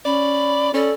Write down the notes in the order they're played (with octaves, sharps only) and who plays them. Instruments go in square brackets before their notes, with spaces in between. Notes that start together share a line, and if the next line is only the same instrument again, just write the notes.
[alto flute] C#4 [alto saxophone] D5 [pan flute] B5
[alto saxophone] C#4 [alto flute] A4 [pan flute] D5